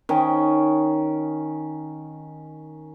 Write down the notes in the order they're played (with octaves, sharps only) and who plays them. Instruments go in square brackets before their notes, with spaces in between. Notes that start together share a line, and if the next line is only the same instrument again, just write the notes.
[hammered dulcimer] D#3 C#4